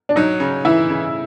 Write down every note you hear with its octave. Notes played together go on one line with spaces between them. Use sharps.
D4
F#3 D#4
C#3
E3 E4
C#3